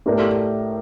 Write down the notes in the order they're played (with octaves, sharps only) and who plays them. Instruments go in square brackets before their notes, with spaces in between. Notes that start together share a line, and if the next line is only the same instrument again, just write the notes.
[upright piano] A2 A3 D4 G4 A#4